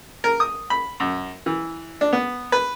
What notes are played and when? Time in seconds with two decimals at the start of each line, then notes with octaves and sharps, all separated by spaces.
0.24 A#4
0.40 D#6
0.70 B5
1.00 F#2
1.46 E3
2.01 D4
2.13 B3
2.52 B4